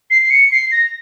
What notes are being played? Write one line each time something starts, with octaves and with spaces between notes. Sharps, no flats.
C7
C7
C#7
C7
A#6